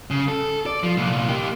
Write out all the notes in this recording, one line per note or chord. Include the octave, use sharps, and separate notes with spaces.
C#3
A4
D5
F3
C2 A#2
A#3 G4